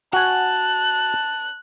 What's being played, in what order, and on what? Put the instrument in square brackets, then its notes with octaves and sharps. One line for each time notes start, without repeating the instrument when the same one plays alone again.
[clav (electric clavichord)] F#4 G#5 [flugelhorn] A5 [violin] F#6